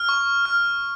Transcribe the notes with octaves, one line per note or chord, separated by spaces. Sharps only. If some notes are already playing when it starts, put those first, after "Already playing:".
Already playing: F6
C#6
F6